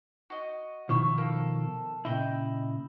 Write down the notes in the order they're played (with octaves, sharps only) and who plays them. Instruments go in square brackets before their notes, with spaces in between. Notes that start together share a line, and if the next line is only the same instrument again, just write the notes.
[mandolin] F#4 D#5
[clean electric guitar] B2 D#3 F3 [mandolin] E4 C#6 E6
[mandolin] A4 A#4 F5
[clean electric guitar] A#2 C#3 E4 [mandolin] D#5 G5